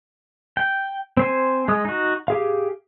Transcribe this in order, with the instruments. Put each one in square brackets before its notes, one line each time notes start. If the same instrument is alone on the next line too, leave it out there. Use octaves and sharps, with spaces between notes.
[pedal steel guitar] G5
C4 C5 G#5
G#3 D#6
D#4 F#4
G4 G#4 F5